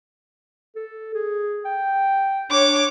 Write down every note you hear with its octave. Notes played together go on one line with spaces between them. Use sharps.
A4
G#4
G5
D4 C#5 D6